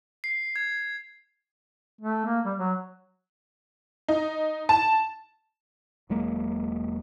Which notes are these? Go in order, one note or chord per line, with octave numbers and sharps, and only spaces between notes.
C7
G#6
A3
A#3
G3
F#3
D#4
A5
E1 F#3 G#3 A#3